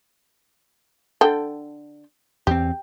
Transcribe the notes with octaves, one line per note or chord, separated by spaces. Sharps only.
D3 A4 G5
E2 C4 G4